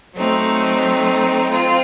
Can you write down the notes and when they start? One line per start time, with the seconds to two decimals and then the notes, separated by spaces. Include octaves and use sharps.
0.14 F#3 A3 C4 D#4
1.50 C4 F4